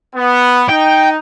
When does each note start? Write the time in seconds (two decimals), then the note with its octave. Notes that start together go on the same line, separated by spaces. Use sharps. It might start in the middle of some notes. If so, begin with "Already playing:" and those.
0.16 B3
0.69 D#4 G5